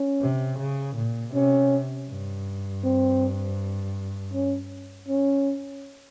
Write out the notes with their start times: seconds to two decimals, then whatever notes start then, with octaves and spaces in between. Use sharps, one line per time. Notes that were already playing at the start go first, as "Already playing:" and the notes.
Already playing: C#4
0.21 C3
0.59 C#3
0.96 A#2
1.34 C3 C#4
2.09 G2
2.84 C4
4.34 C#4
5.09 C#4